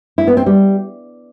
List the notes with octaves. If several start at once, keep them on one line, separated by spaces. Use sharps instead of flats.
E4
B3
C4
G3